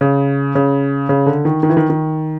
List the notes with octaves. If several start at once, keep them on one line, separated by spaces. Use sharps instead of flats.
C#3
C#3
C#3
D3
D#3
D#3
E3
D#3
D#3